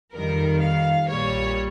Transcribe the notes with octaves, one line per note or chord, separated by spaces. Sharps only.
F2 D#3 G3 A#4
F5
A#1 A#2 G3 C#5